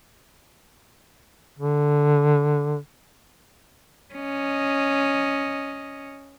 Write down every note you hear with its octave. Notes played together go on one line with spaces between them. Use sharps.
D3
C#4 D#5